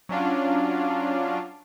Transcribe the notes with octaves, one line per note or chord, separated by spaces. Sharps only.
F#3 C#4 D4 F4